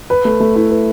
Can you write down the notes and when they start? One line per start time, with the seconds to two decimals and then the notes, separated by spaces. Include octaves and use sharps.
0.10 B4
0.25 A3
0.40 A3
0.56 E4
0.70 B4